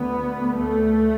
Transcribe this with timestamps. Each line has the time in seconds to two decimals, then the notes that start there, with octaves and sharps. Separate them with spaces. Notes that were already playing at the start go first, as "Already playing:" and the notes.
Already playing: D2 B3
0.57 A3